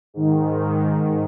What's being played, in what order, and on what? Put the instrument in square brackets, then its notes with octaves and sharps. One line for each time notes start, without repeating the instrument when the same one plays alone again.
[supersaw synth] G#2 D#3